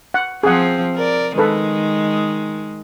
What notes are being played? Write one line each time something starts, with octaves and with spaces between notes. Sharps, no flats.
F#5
F3 C4 G#4 F#5
A#4 D5
D#3 G#3 A4 B4